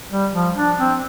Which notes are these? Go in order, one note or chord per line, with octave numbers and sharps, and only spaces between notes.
G3
F3
D4
C4